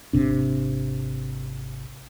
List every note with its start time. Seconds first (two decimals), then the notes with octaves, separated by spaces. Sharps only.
0.13 G#1 C3 D4